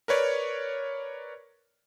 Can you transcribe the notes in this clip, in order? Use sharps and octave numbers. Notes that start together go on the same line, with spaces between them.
A#4 B4 C#5 D5